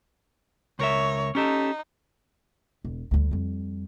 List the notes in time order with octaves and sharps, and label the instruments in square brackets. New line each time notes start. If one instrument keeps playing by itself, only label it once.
[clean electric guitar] C#2 A#4 E5 [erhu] C#5
[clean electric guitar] C#4 G4 A4 [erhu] D#4
[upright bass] E1
D2 G3
F2 G3